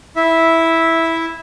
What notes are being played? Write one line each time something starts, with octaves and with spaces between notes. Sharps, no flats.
E4 E5